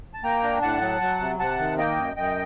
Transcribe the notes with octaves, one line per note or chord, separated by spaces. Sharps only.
A5
A#3 G5 A#5
D4
A2 F#5 A5
F#3
F#3
C3
C3 F#5 A5
D#3
A#3 D#5 G5
F#2
F#2 D#5 G5